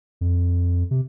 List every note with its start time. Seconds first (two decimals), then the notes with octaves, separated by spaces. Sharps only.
0.21 F2
0.91 C3